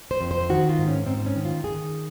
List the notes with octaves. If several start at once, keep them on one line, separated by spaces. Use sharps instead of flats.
C5
F2
C5
D#3 F#4
F4
G#2
C#4
G#2 C4
C#4
D#3
F4
D#3 G#4